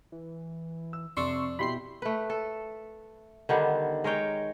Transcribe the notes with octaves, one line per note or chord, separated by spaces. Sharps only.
E3
E6
F2 C3 D4 C6 C#6 E6
B2 E4 G4 B5 C6 C7
A3 B4
A4
D3 D#3 G3 B3
G#3 A#4 C#5 G5